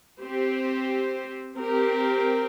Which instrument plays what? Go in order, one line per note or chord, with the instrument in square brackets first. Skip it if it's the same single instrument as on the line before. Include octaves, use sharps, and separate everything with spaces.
[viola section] C4 G4 C5
C4 G4 A#4